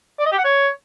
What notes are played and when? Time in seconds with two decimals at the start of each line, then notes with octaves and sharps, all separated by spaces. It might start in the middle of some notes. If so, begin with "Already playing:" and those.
0.19 D5
0.25 D#5
0.32 G4
0.38 F#5
0.44 C#5